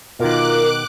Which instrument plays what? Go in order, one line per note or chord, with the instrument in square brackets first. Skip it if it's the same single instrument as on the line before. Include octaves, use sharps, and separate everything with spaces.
[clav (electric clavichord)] B2 D#3 [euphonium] F4 [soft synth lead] A#4 [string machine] D6 F#6